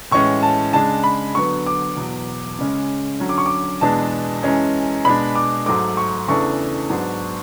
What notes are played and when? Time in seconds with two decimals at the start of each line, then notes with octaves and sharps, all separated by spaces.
0.11 A2 E3 G#3 C#4 C#6
0.43 A5
0.73 C#3 G#3 D4 A5
1.04 B5
1.34 D3 F#3 B3 C#6
1.66 D6
1.96 E2 B2 F#3
2.59 C#3 G#3 C#4
3.20 D3 F#3 C#4
3.29 D6
3.38 C#6
3.46 D6
3.81 E2 B2 G#3 D4 A5
4.43 F#2 E3 G#3 C#4
5.05 B2 G#3 D4 B5
5.35 D6
5.66 G#2 F#3 A3 D6
5.97 C#6
6.28 E2 C#3 E3 A3 D4 C#6
6.90 G#2 F#3 B3 D4